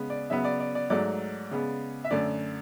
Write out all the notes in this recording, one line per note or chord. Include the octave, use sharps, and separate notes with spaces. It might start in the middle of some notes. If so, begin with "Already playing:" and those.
Already playing: C#3 G#3 B3
D5
C#3 F#3 B3 E5
D5
D5
D5
G#2 F#3 A3 D5
C#3 G#3 B3
E5
F#2 D3 A3 D5